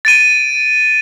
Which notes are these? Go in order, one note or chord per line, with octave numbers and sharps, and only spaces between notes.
A6 D7 D#7